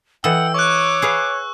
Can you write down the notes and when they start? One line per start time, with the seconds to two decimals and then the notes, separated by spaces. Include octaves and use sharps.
0.24 E3 A4 D#5 F#5 G5 E6
0.54 C#5 C#6 D6 F#6
1.02 G#4 B4 F5